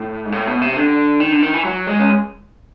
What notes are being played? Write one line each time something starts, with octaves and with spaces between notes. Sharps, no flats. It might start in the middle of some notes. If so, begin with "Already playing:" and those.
Already playing: A2
G#2
A2
B2
C3
D3
D#3
D3
D#3
E3
F#3
G#3
C#4